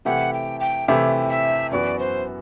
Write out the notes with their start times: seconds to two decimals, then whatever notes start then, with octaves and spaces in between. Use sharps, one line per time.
0.05 C3 E3 A3 E4 G4 F#5
0.33 G5
0.60 G5
0.88 C3 E3 A3 E4 G4
1.30 E5
1.71 F#2 E3 B3 F#4 D5
1.99 C5